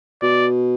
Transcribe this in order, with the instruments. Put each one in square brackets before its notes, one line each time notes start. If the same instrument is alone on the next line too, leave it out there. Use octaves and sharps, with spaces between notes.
[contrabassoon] B2 [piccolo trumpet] D5